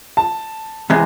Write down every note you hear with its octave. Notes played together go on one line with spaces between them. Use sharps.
A5
E2 C3 G#3